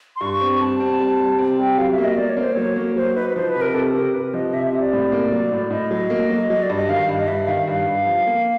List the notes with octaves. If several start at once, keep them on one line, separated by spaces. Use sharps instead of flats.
C6
G2 C#6
C4
G3 A5
C4
G3
G3
C4
G3 G5
F#3 F5
E5
A#3
D#5
A#3 D5
C#5
A#3 C5
F#3 C#5
A#3
F#3 C5
D#4 B4
B4
F3 C5
B4
C3
A#4
C3 A4
C3 A#4
C3 B4
F3 D#5
C3 E5
E5
C3
D5
A2
A#3
F#3
A2
A2 D#5
F#3
A#3
F#3
F#3 D#5
D5
G2
D#5
D#3 F5
G2
D#5
G2 E5
D#3 F5
G2 F5
G2
F3
A#3